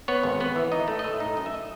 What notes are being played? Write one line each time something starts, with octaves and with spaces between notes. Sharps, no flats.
B3 C#5
G#1
B3
E3
D#4 D#5
A3
D#5
A2 E5
D#4
F#2 D#5
E5
D#5